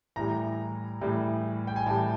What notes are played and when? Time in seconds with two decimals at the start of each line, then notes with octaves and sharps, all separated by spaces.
0.16 A2 E3 G3 A#5
1.01 A2 E3 G3
1.67 G5
1.76 G#5
1.86 A2 E3 G3 A5